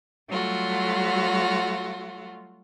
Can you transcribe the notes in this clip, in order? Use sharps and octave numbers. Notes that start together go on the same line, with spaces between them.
F#3 G3 A3 F4 F#4